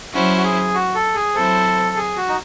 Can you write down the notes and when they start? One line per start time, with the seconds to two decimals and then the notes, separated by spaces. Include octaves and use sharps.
0.13 F#3 C#4 E4 F#4 C5
0.37 F#4
0.44 G#4
0.74 F#4
0.95 A4
1.15 G#4
1.35 F#3 C4 E4 A4 C5
1.96 G#4
2.16 F#4
2.29 D#4